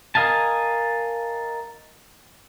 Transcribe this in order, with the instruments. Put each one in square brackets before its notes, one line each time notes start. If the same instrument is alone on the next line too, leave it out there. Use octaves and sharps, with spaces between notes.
[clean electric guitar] A#4 D#5 F5 G#5 A5